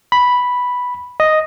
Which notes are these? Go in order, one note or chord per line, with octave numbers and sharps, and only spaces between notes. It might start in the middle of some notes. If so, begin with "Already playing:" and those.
B5
D#5